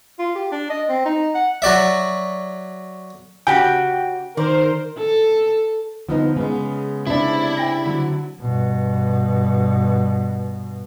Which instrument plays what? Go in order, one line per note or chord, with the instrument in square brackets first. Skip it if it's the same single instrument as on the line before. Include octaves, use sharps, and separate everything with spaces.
[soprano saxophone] F4
G4
D4
D#5
C4
D#4
F#5
[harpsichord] F#3 F#4 D5 E5
[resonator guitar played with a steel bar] C#3 F#4 G4 [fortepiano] G5
[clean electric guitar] D#3 [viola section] A#4 C5 [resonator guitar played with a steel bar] D5
[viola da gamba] A4
[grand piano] D3 [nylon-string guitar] F3 B3 D#4
[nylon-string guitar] C#3 [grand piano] G#3 B3
[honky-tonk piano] C3 D4 [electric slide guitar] E4
[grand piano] G5 A#6 F#7
D3 F#3
[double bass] G2 B2